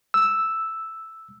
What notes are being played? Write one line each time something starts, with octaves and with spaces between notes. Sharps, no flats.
E6